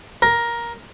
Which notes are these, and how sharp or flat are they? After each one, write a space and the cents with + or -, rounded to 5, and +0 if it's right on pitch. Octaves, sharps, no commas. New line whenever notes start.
A#4 +10